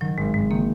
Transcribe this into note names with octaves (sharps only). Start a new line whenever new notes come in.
D#3 F#3
G#1 G#3
G#1 G#3
D#3 A#3